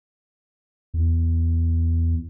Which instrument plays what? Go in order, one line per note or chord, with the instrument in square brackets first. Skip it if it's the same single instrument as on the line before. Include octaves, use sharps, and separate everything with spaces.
[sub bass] E2